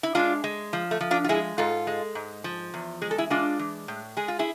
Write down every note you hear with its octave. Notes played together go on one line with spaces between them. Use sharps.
E4
G#3 D4 F4
G#3
F3
A3
F3
D4 F4
F4
G#3 E4 G#4
G#2 F4 A4
G#3
G#2
F3
E2
G#3 G#4
A4
E4 G#4
G#3 D4 F4
E3
A2
G#3 G#4
F4
E4 G#4